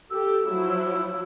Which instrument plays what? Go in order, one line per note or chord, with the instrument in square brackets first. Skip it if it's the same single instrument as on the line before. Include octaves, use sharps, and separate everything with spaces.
[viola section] G4 A4 [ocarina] E6
[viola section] F3 F#3 E4